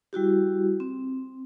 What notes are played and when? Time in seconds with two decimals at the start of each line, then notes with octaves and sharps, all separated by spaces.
0.13 G3 E4 F#4 G4
0.80 C4